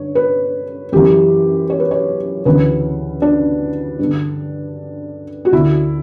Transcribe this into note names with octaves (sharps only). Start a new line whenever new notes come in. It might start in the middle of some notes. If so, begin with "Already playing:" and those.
Already playing: G2 D3 C#5
B4
F#2 E3 G4
C#5
B4
C#5
D2 C#3 E3 B4
D4
G2 D3
F#4
D2 D3 E4